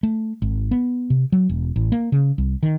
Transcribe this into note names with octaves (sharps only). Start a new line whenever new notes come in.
A3
G#1
B3
C3
F#3
E1
A1
A#3
C#3
C2
D#3